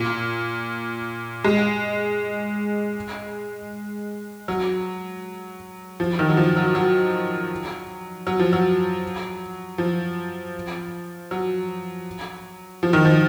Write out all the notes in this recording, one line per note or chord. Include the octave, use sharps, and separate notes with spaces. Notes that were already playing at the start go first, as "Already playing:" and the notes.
Already playing: A#2
G#3
F#3
F3
D#3
F#3
F3
F#3
F#3
F#3
F3
F#3
F3
F#3
F3
D#3
F3